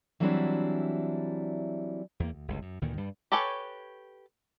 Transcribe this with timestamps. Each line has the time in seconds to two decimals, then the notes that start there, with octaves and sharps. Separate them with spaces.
0.20 E3 F#3 G3 C4 D4 E4
2.20 E2 A#3
2.33 D2
2.48 G1 C#2
2.62 F#2
2.82 D2 A#2 D#3 E3
2.97 G2 G3
3.32 G4 A4 B4 C#5 G#5